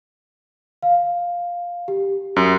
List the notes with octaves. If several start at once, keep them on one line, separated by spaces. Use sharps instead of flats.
F5
G4
F#2